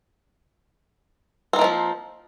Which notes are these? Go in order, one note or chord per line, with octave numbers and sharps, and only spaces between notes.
F3 A3 A#3 C4 D#4